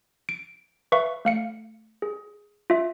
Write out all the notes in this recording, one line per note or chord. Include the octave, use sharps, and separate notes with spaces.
D7
B4 E5 F5 C#6
A3 F5 C#7
G#4
F4 E5